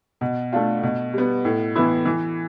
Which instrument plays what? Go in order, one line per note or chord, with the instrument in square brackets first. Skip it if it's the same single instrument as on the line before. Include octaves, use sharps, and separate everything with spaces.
[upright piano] B2
A3 D4 F4
B2
G3 B3
A2
E3 B3 E4
E3